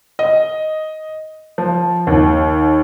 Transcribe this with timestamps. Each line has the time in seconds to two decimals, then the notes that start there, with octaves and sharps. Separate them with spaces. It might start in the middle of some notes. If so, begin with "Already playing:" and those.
0.19 D#5
1.58 F3
2.07 D#2